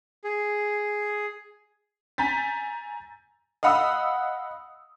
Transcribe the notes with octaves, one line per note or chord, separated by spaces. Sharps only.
G#4
G#5 A#5 G6 A6 B6
D#5 F5 F#5 B5 D#6 E6